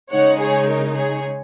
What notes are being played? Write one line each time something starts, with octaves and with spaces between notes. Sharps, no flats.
C#3 G#3 D#4 C#5 F#5
G#4 C#5
A#4
G#4 C#5